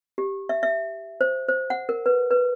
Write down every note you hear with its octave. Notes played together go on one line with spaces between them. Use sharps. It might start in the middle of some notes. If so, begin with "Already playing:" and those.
G4
E5
E5
C5
C5
F#5
A#4
B4
B4